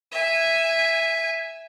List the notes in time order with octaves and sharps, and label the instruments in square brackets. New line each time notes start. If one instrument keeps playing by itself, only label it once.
[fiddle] E5 G#5